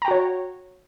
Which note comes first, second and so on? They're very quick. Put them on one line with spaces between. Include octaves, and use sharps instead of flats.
A#5 G5 F#4 C#5